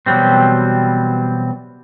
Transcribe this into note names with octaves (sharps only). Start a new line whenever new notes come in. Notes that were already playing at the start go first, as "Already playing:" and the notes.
B2 E3 F#3 G3 C4